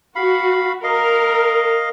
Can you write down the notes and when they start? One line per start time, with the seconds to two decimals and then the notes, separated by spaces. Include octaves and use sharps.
0.16 F#4 F5 B5
0.84 A#4 D#5 F5